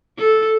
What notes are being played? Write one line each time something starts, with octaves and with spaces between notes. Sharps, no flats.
A4